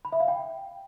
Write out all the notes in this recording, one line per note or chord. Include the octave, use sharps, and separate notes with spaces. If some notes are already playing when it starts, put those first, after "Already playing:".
B5
E5
F5
G5